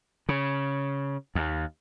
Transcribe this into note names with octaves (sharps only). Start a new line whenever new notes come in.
C#3
D#2